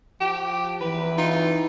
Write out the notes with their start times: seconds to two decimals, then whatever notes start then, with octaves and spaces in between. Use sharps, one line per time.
0.21 F3 G4
0.81 E3 B4
1.18 D#4 F4